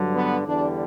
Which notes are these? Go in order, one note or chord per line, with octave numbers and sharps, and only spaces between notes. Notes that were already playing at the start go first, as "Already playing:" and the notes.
Already playing: G2 D3 F#3
B3
E2 D3 G3 D4